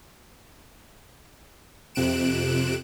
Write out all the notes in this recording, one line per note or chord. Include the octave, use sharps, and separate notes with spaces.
F2 C3 F#6 D7 E7